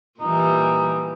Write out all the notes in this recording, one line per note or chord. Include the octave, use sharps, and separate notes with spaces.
A#2 E3 G3 D#4